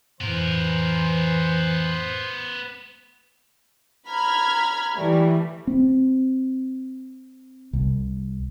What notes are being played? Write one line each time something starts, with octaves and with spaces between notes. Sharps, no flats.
F2 A2 E3 B3 A#4 C5
A#5 B5 F6 G#6
E3 G3 A3
C4
C2